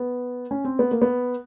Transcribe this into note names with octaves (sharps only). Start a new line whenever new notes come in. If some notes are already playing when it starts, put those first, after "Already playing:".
Already playing: B3
C#4
C4
B3
A#3
B3